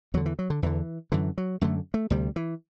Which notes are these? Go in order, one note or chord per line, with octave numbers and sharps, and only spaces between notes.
E2 D3 F#3
E3
F#3
D3
E2 D3 E3
F#2 D3 E3
F#3
F#2 D3 A3
A3
D2 C3 G3
E3